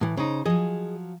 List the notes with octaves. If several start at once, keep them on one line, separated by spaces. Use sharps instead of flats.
A2 E3
C#3 D#4 C5
F3 F#3 G#4 D#5